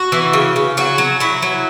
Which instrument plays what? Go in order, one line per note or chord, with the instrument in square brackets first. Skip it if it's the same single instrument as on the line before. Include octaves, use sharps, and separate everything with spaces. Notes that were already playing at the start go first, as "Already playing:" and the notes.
Already playing: [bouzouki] F#4
E3
C#3
C#3
F#3 F#4
F#3
F#3 E4
F#3